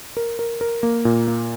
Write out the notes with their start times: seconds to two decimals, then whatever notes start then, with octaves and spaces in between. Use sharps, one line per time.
0.17 A#4
0.39 A#4
0.61 A#4
0.83 A#3
1.05 A#2
1.28 A#3